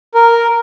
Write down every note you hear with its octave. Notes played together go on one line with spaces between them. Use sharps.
A#4